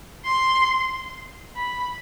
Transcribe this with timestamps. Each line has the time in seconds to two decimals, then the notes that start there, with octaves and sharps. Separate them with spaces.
0.25 C6
1.56 B5